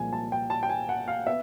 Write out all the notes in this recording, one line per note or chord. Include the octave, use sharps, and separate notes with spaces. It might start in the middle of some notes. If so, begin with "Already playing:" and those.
Already playing: C2 A#2 F3 G#3 G#5
A5
G5
A5
G5
G#5
F#5
F5
B3 E5